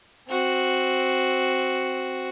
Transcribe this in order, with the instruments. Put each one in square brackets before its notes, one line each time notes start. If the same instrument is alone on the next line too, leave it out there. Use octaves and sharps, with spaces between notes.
[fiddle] C4 F#4